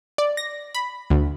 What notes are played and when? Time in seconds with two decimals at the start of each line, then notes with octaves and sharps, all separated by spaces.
0.18 D5
0.37 A#6
0.75 B5
1.10 D2